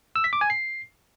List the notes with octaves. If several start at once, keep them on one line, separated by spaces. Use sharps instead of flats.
E6
B6
D6
G#5
C7